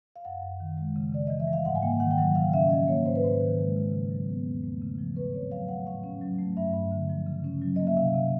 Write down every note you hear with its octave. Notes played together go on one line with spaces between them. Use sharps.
F5
F#2 F#5
F#2
D#3
G#3
C#3
C#3 D5
E3 D#5
E5
G3
F5
G#2 F#5
G#5
A#3 G5
D#3 F#5
G5
F#3 F#5
C#3 F5
C#4 E5
F3 D#5
A#3 C#5
G#2 C5
B4
G#2 C5
D#3
G#3
C#3
C#3
F#3
B3
E2
A3
C#3
F3
A2 B4
C4 C#5
F#3 F5
A3 F#5
A2 F5
C#4
F#3
A3
G2 E5
G2
D3
F3
C#3
C#4
F#3
A#3 D#5
E5
C3 F5
C3